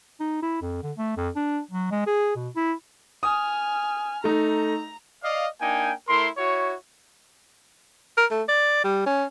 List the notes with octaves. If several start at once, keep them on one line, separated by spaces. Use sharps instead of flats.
D#4
E4
F2
D3
A3
F2
D4
F#3
G#3
G#4
B2
E4
G#5 D#6 F6
A3 D#4 A#5
D5 D#5 F5
A#3 D4 D#4 G5 G#5
A3 E4 A#4 C6
E4 F#4 C#5
A#4
A3
D5
G3
C#4